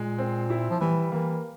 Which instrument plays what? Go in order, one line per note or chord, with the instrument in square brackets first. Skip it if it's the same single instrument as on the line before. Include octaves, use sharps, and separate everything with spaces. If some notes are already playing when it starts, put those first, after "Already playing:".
Already playing: [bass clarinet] A#2 [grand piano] G#3
[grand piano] C4
E4
[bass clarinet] F3
[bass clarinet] E3 [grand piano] G3
[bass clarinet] E3 [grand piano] A#3